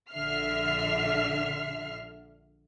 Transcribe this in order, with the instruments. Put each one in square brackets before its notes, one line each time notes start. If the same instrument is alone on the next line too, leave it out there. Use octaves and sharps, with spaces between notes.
[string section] A#1 D3 E5 F6 C7